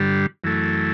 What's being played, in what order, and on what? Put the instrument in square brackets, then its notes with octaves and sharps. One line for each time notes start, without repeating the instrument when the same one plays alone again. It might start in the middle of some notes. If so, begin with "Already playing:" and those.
Already playing: [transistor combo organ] G2 D3 G3
F#2 E3 A3